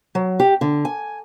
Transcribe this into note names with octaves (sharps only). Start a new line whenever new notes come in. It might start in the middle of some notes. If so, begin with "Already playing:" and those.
F#3
G4
D3
G#5